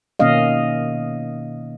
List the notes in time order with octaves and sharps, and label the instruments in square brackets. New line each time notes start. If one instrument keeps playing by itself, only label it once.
[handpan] B2 D#3 A#3 C#4 D#5 F5